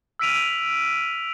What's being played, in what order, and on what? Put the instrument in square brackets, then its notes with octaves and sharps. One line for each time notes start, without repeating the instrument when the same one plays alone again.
[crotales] E6 F6 B6 D7 D#7 F7